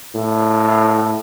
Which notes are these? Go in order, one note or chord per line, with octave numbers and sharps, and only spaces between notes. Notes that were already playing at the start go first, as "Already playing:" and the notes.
A2